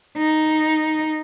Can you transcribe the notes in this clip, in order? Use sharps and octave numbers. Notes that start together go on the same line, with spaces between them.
D#4